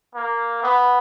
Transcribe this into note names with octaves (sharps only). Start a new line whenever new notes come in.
A#3
B3